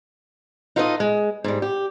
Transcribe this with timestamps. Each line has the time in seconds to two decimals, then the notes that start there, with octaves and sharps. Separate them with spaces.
0.76 D#4 F4 A4 B4 C#5 D#5
1.00 G#3
1.44 G#2 G3
1.62 G4